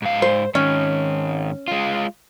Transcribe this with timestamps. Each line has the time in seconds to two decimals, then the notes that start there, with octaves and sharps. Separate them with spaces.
0.02 G#2 F5
0.22 C5
0.55 G#2 D#3 C#4
1.68 G#3 F4